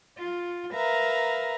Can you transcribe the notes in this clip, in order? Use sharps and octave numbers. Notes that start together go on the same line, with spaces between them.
F4
A#4 B4 E5 F5 A#5